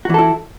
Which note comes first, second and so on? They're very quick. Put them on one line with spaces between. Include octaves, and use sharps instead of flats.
F#4 E3 A4 E4